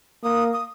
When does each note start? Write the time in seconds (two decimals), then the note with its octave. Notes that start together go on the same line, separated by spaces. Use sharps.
0.23 A#3 D#6
0.53 D#6